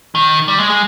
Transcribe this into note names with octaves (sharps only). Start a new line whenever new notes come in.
D#3
G3
G#3
G#3